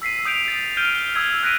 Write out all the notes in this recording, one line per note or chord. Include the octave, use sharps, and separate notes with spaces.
E6 B6 C7 D#7
D#6 G6 D7 F7
A6
F6 G6 D7 D#7 F7 G7
D#6 E6 G#6 G7
E6 F#6 A#6 B6 D7 D#7